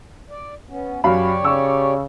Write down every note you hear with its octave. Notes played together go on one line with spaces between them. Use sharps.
D5
B3 C#4
F#2 G4 C#5 D5 F5 B5
C#3 C#6 E6